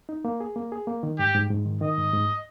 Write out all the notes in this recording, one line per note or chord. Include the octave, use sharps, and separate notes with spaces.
D#4
A#3
G#4
A#3
G#4
A#3
D#3
G#2 G4
G#2
G#2
D#3
D#3 D#5
G#2
G#2